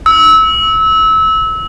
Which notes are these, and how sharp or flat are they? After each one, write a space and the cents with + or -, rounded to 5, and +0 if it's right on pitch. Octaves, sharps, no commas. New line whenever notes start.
E6 -25